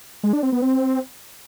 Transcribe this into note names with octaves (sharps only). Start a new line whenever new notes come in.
G#3
D4
C4
B3
C4